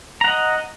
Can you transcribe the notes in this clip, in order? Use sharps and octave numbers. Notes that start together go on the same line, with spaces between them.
D#5 F#5 A#5